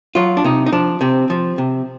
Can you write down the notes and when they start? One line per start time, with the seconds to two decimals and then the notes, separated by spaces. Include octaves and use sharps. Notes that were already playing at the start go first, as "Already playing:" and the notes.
0.15 F#3 F4
0.37 D4
0.44 C3 D#4
0.66 D#4
0.72 F3 D4
1.01 C3 C4
1.30 F3
1.58 C3